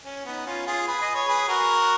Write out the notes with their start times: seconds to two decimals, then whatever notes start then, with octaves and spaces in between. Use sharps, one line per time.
0.05 C#4
0.26 B3 D#4
0.46 C#4 F4
0.67 F4 G#4
0.87 G#4 B4
1.01 D#5
1.14 C#5
1.28 G#4 B4
1.48 F#4 A#4